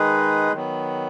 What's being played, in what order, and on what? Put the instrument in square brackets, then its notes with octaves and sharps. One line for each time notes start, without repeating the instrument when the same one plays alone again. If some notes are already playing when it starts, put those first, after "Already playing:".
Already playing: [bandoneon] D#3 G#3 D#4 G#4 B4
D#3 F#3 B3